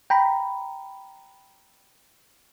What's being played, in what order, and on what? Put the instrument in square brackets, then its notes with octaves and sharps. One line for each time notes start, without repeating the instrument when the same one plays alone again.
[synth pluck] G5 A#5 B5